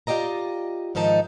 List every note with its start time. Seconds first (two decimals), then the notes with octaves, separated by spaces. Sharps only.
0.07 F4 G4 D5 D#5 A#5
0.95 G#2 D#3 F3 D#4 A5